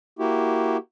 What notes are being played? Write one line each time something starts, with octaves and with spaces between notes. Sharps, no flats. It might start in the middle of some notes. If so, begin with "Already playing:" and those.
A#3 E4 F#4 G4